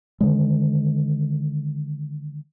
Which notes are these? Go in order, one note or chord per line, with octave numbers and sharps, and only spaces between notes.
D3 D#3 G#3